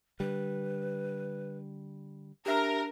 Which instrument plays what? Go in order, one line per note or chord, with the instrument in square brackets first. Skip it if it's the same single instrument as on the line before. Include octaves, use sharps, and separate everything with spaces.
[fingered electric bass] D3 G3 [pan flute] B4
[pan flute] D4 [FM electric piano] G4 E5 F6 [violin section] A#4